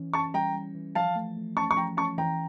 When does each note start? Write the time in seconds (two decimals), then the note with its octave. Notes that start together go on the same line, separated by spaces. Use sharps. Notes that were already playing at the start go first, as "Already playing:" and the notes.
Already playing: E3 C#4
0.13 C#4 A5 C#6
0.34 G3 G5 A#5
0.54 G3
0.75 E3
0.95 F3 F5 A5
1.16 A3
1.37 A3
1.56 C#4 A5 C#6
1.71 C#6
1.77 F3 G5 A#5
1.97 C#4 A5 C#6
2.18 E3 G5 A#5